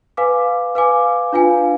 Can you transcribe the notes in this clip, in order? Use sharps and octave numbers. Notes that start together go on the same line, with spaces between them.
B4 F5 G#5 D6
B4 F5 G#5 D6
D4 F4 B4 F5 G#5